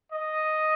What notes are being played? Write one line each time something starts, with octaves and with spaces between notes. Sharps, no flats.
D#5